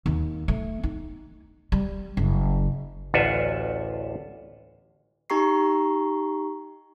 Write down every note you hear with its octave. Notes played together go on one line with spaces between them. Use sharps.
D#2
A3
D#4
G3
F#1
A1 D2 F4 E5 F#5
D#4 G4 A#5 C#6 C7